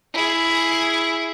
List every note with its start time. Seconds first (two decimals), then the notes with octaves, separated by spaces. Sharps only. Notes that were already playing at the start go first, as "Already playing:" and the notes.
0.14 E4 G#4